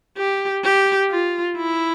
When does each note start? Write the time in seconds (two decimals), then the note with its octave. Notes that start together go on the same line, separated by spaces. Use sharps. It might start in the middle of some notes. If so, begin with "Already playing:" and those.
0.17 G4
0.64 G4
1.10 F4
1.56 E4